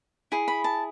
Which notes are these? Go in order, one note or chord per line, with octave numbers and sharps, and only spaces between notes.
E4 G#4
B5
A5